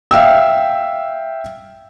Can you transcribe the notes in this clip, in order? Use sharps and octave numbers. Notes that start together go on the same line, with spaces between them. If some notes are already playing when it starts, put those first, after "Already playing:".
E5 F5 G5 E6